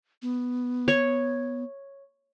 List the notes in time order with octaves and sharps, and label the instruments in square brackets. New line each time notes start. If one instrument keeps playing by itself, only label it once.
[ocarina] B3
[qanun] C#5